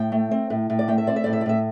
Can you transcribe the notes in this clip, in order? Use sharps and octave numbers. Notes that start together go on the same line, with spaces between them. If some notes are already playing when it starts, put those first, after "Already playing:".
Already playing: A2 G5
A3
C4
A2
A2
D5
A3 G5
E5
C4 D5
E5
A2 D5
E5
D5
A2 E5